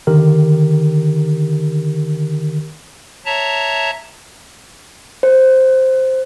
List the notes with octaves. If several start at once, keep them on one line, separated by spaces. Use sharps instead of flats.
D3 D#3 G4 A#4
C#5 E5 A5 A#5
C5